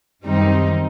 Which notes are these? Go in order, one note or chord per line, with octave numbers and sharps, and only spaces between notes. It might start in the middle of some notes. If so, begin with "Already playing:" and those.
F#2 D#3 G3 C4 D#4